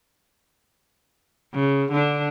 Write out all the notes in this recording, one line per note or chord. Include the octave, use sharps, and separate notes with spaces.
C#3
D3 D4